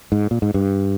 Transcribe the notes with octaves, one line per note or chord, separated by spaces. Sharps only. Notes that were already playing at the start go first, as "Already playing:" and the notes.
G#2
A#2
G#2
G2